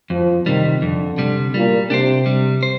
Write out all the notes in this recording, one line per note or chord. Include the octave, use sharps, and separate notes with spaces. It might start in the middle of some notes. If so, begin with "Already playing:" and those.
F2 F3
C3 D#3 G3
F2 D3
C3 G3
A#2 G3
C3 D4 G4 C5
G3
C5